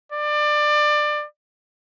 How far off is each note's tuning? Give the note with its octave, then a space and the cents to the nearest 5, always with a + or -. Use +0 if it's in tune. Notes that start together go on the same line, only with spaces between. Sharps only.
D5 +25